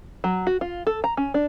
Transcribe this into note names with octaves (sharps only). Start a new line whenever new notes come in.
F#3
F#4
F4
A4
A#5
C#4
D4